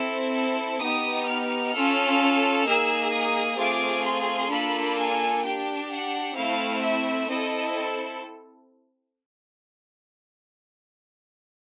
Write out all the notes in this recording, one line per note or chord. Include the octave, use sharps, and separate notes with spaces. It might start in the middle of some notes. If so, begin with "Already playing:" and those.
Already playing: C4 E4 A4
B3 D#4 G4 D#6
F6
C#4 F4 A4
A#3 D#4 G#4 E6
D#6
A3 C4 F4 G#4 D6
C6
A#3 D4 F4 A4 B5
G#5
D4 G4 G5
F#5
A3 C4 E4 F5
E5
C4 E4 A4 D#5